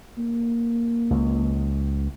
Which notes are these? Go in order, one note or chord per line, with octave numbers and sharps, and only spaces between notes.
A#3
C#2